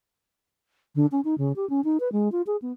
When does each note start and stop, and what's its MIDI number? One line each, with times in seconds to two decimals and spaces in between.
0.95 1.06 50
1.12 1.21 61
1.25 1.35 63
1.38 1.52 49
1.56 1.68 67
1.70 1.81 61
1.84 1.98 63
2.00 2.11 71
2.12 2.31 56
2.32 2.42 65
2.47 2.56 68
2.62 2.72 59